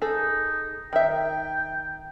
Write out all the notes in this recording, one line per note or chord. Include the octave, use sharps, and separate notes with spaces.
D#4 G#4 A4
D#3 E5 G5